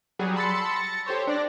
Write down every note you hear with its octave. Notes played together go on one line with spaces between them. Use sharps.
F#3 G3 F#4 G#4
A5 B5 C6 E6 A6 C#7
A6 A#6 C#7
G4 A4 C5 C#5
D4 D5 A#6